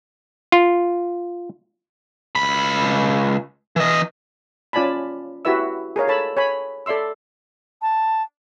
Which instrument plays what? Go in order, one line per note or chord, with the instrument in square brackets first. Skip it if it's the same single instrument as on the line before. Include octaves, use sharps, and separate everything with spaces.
[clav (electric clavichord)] F4
[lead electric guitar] C#2 B5
E3 D#5
[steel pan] C#4 F4 D5 G#5 A5 B5
E4 F#4 G4 B4 E5 E6
G#4 A#4 C#5 F5
A4 C#5 A5 B5
C#5 G#5 B5
A4 D5 E5 C6 E6
[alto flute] A5